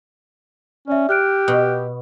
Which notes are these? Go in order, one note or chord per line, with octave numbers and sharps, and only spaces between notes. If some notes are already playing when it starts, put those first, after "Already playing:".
C#4 D5 E5
G4 F6 F#6 D7
B2